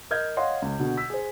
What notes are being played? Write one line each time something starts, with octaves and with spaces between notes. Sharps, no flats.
A#4 D#5 F6 G6 G#6
C#5 D#5 F5 F#5 C6
C#2
B2 D3
E6 B6
G#4 C5